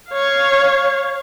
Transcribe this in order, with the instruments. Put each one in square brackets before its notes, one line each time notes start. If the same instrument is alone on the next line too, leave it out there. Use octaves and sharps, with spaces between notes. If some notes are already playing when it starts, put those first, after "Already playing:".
[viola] C#5 F5